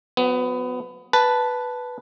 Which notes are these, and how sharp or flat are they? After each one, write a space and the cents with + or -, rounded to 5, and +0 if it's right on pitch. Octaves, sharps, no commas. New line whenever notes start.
F#3 -30 B3 +20
B4 +0 A5 +0